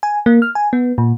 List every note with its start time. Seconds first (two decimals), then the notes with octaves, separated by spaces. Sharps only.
0.03 G#5
0.26 A#3
0.42 F6
0.55 G#5
0.73 B3
0.98 A#2